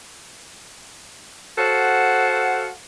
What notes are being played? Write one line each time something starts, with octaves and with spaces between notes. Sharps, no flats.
F#4 A4 C5 F5 F#5